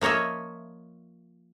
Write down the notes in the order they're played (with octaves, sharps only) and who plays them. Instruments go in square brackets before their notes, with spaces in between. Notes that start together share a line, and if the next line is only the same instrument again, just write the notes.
[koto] F3 A#3 C#5 D#5 E5